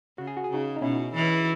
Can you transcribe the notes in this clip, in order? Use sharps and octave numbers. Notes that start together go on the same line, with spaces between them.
C#3 F#4
G#4
F#4
G#4
C#3 D#4 F#4
D#4
B2 C#4 E4
E3